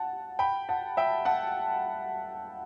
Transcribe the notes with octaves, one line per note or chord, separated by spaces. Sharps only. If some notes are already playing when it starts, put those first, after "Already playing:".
Already playing: F#5 A5
G5 B5
F#5 A5
E5 G5
F#5 A5